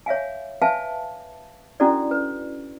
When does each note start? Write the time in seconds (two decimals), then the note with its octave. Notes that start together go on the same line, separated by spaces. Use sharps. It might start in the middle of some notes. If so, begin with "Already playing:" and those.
0.06 C#5 E5 F5 G#5
0.62 B4 E5 F5 G#5 A5
1.80 C#4 D4 E4 F#4 A4 D5
2.11 B4